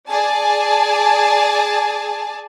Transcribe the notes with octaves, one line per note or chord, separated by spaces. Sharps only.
G#4 D5 G#5 A5